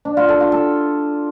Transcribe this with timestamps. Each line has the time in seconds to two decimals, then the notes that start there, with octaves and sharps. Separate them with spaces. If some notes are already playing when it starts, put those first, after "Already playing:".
0.05 D4
0.17 F4
0.29 A4
0.40 F4
0.52 A4